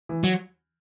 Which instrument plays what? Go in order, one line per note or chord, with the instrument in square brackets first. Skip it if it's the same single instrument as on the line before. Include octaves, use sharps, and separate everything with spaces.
[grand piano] E3
[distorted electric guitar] F#3